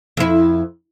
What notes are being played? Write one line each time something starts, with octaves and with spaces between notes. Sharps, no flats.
F2 E4